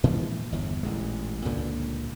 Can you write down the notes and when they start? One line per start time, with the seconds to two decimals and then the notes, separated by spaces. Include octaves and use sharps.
0.04 A#2 E3 F3 G#3
0.52 G1 E2
0.83 A1 A#2 G#3
1.45 C#2 G2 A#2 D3